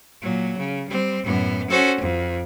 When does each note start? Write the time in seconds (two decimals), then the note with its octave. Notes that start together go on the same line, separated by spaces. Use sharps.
0.21 A#2 F#3
0.57 C#3
0.88 G3 C4
1.24 F#2 A2 B3
1.70 C#4 F#4 A4 C5
2.01 F2